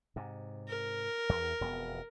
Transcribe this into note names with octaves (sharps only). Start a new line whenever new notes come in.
G#2 C3
A#4
E2
E1 F2 B3